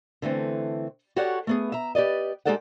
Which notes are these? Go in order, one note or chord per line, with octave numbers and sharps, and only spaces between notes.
D3 E3 A3 C4
F#4 G4 A4 C#5 D5 F#5
A3 B3 G#4
E5 A#5
G4 B4 D5 D#5
G#3 D#4 G4 A4 D5 F#5